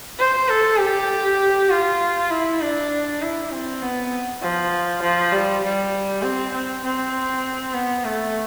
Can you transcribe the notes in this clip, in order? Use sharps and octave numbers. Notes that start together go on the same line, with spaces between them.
C5
A4
G4
F4
E4
D4
E4
C4
B3
F3
F3
G3
G3
C4
C4
C4
B3
A3